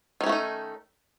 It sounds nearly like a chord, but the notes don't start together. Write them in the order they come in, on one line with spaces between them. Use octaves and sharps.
D#3 C#4 A3 F#4 D#4